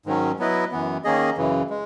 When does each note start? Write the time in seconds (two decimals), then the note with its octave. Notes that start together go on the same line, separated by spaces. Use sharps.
0.06 G#2 D#3 F#3 C#4
0.39 F#3 B3 E4 B4 D#5
0.71 F#2 E3 B3
1.04 D#3 A#3 C#4 G#4 D#5
1.37 F#2 C#3 E3
1.70 G#3